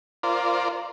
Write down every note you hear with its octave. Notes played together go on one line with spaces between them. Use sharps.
F4 A#4 C5 D5